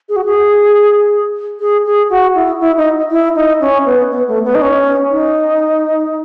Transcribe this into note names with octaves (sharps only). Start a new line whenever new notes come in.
G#4
F#4
G#4
G#4
G#4
F#4
E4
E4
D#4
E4
D#4
C#4
B3
B3
A3
B3
D#4
C#4
D#4